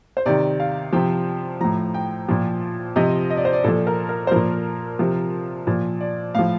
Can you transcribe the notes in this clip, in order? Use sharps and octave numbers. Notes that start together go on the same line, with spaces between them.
C5
C3 D#3 D5
F5
C3 F3 G5
A2 F3 A#5
G5
A#2 F3
C3 F3 D#5
D#5
D5
C5
D5
A#2 F3 A4
A#4
A#4
C5
A#2 F3 A#4
C3 F3
A#2 F3
D5
A2 F3 F5